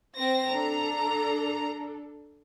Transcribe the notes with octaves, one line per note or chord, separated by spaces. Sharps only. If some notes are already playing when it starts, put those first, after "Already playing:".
C4 C5 A#6
D4 A4 A#5